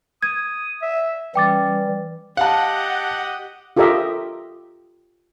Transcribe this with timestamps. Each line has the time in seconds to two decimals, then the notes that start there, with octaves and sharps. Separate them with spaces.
0.23 D#6 G#6
0.82 E5
1.35 E3 G3 C#4 G5 D6 A6
2.37 G4 D#5 F5 F#5 A5
3.77 F4 G4 A4 A#4 D#5 E5